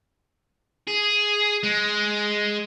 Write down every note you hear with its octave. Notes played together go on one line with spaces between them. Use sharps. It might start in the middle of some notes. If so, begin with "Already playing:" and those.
G#4
G#3